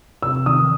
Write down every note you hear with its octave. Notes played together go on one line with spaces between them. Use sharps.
C3 E6
D#3 D#6